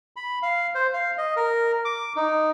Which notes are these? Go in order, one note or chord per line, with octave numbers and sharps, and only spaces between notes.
B5
F5
C5
F5
D#5
A#4
D6
D#4